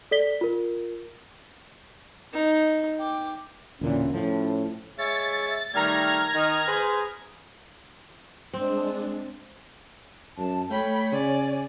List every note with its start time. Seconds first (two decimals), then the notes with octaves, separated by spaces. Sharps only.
0.11 A4 D5 B6 G7
0.41 F4 A#4
2.33 D#4
2.99 G5 D6
3.81 E1 A#2 D3 E3 C#4
4.14 A2 F3 C#4
4.98 G#3 C#5 E5 A6
5.74 D#3 G3 A3 A#5 F6 G#6
6.34 D#3 D#5
6.67 G#4 B4 C5
8.53 G#3 C4 D4
10.37 F#2 A5
10.70 A3 C#5 G5 B5
11.12 C#3 D5 G#5